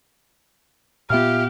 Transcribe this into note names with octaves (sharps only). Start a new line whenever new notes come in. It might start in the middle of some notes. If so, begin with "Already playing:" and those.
A#2 B3 F4 G4 E5 F5 F6